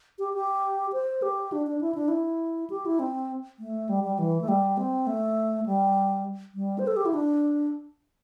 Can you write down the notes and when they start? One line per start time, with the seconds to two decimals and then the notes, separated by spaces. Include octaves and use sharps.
0.19 G4
0.34 G4
0.93 C5
1.22 G4
1.52 D4
1.67 D4
1.81 E4
1.95 D4
2.08 E4
2.70 G4
2.86 E4
2.99 C4
3.59 A3
3.89 G3
4.04 G3
4.19 E3
4.41 A3
4.48 G3
4.77 C4
5.07 A3
5.66 G3
6.55 G3
6.78 C5
6.87 A4
6.96 G4
7.06 E4
7.14 D4